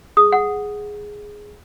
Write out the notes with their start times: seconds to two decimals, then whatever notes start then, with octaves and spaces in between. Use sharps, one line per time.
0.17 G#4 D#6
0.32 F#5